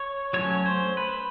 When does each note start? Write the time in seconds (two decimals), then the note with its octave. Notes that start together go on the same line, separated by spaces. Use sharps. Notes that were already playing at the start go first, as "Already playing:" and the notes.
Already playing: C#5
0.33 F#3 A3 C#4 C#5
0.66 C5
0.97 B4